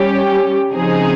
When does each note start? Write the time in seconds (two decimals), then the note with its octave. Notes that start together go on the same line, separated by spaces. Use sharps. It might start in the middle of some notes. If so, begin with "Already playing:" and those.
Already playing: G3 C#4 G4
0.71 C#3 F3 C4 D#4 G#4